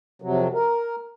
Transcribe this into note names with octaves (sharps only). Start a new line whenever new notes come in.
F2 C3 F#3
A#4